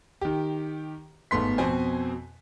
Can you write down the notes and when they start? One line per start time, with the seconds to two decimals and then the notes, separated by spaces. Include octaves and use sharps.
0.21 D#3 G4
1.31 G1 G#2 A3 B3 C6 B6
1.58 F2 B2 C4 C5 G#5